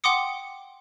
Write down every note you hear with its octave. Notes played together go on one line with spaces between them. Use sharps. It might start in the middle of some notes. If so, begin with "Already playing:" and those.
F#5 G5 C6 D6 D#6 C#7